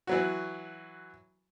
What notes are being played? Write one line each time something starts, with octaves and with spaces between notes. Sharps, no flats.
E3 F#3 F#4